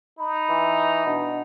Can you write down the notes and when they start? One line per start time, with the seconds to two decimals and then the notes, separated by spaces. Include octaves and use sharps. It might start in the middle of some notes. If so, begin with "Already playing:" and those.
0.19 D#4 B5
0.49 E3
1.06 B2 D4